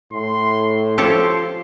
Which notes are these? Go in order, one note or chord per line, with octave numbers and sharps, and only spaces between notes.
A2 C6
F3 G4 A4 C#5 C6